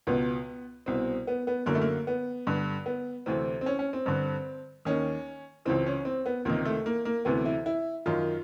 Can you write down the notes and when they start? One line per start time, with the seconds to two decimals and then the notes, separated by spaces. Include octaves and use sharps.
0.07 C#2 B2 B3
0.86 C2 B2 C4
1.27 B3
1.47 B3
1.66 F#2 D3 A#3
1.75 A3
1.81 A#3
2.07 B3
2.47 G2 D3
2.86 B3
3.26 D2 C3 E3 C4
3.61 C4
3.66 C#4
3.79 C#4
3.93 C4
4.06 G2 D3
4.85 D#2 D#3 C#4
5.65 C#2 C#3 E3 C4
5.86 C#4
6.05 C4
6.26 B3
6.45 C#2 C3 D#3 A#3
6.65 A3
6.86 A#3
7.05 A#3
7.25 D2 C3 E3 B3
7.45 E4
7.66 E4
8.06 F#2 D#3 F4